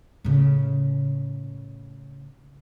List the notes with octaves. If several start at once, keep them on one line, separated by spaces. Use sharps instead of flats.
A2 C#3